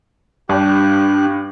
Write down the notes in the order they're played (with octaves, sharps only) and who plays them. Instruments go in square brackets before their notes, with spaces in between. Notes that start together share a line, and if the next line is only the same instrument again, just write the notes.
[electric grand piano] G2 [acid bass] D4 [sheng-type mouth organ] G4 F#6